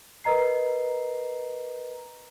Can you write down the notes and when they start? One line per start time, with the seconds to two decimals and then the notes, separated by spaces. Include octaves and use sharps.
0.24 A#4 B4 D#5 A#5 C7